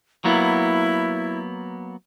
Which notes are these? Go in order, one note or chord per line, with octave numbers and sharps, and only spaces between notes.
F#3 A#3 B3 E4